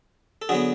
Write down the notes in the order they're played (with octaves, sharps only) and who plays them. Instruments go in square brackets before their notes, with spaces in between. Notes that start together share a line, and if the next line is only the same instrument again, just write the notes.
[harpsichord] A4
D3 F#3 B3 F#4 G#4